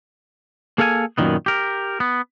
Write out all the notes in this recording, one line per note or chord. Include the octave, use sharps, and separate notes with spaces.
A#3 G#4 A4 F5 F#5 G#5
F#2 A#2 D#3 B3
G4 A#4
B3